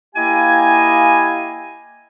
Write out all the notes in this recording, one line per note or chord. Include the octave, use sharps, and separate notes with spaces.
A#3 E4 G4 D#5 F5 G#5